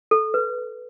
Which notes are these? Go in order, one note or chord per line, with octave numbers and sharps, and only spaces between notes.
A4
B4